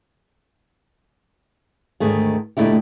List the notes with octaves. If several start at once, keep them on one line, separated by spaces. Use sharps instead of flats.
D2 G#2 D#3 A3 G#4
A#2 D3 A3 D#4 E4 G4